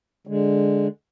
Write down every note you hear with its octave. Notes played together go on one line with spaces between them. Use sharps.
D3 G#3